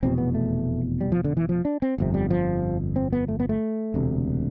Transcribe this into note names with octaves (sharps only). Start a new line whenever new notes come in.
F1 E2 B2 C4
B3
A3
G3
F3
D3
E3
F3
D4
C4
G1 F2 C3
G3
F3
C4
B3
A3
B3
A3
E1 D2 C3